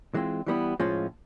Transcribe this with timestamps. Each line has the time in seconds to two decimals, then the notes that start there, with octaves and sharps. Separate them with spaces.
0.14 E3 G#3 C4 F4
0.46 E3 G3 B3 E4
0.80 A2 F3 G#3 C#4 F4